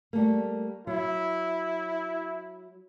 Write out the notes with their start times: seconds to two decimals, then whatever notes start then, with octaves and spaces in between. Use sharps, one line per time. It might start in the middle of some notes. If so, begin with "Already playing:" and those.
0.13 G3 A3 A#3
0.87 F#3 E4